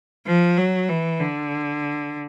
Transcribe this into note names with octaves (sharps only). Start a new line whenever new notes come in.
F3
F#3
E3
D3